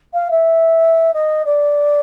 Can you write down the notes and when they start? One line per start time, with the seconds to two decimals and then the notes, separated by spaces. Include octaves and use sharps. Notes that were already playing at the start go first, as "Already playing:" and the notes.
0.14 F5
0.30 E5
1.13 D#5
1.45 D5